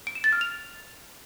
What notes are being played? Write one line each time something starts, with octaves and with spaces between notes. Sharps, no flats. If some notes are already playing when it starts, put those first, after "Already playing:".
D7
E7
A6
F6
F7